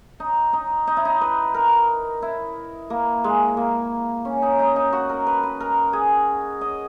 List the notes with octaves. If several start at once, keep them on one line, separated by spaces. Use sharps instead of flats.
D#4
D#4
D#4
E4
D#4
B4
A#4
E4
A#3
G#3
A#3
C#4
D#4
D#4
D#4
F#4
A#4
B4
B4
A#4
G#4
D#5